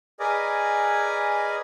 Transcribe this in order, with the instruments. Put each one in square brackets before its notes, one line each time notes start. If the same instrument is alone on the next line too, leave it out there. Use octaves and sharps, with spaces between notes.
[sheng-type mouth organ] G#4 A#4 B4 D5 D#5 G#5